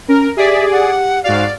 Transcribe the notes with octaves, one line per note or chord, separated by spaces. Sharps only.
C#4 A#4
G4 G#4 D5 E5
F#5
G#2 F#4 D5 F5